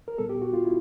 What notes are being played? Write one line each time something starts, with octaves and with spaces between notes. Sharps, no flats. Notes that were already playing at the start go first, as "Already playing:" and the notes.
A#4
A#2 G3 B3 A4
G4
F#4
F4
E4